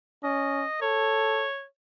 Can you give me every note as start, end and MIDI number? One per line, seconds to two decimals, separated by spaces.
0.24 0.65 61
0.24 0.78 75
0.82 1.48 69
0.82 1.64 73